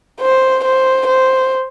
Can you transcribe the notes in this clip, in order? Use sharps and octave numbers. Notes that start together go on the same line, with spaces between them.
C5
C5
C5